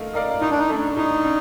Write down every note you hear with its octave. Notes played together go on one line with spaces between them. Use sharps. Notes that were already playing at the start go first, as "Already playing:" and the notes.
Already playing: A3 D#4 A#4 F5
D#4 A#4 D5 F5
A2 D#4
D4
D#4
A3 D4
A2 D#4
D4